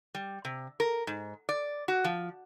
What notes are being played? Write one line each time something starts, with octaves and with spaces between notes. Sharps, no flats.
G3
C3
A#4
G#2
D5
F#4
F3